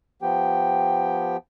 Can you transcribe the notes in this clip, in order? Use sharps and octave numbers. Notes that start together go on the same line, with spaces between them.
F3 B3 G4 G5